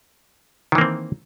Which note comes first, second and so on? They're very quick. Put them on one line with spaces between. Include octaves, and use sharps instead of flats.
D#3 E3 A#3 C4